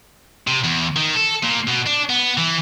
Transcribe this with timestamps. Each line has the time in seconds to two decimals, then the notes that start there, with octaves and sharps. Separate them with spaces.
0.47 C3
0.64 E2
0.96 D#3
1.16 A4
1.44 A#2
1.68 B2
1.87 D4
2.10 B3
2.37 E3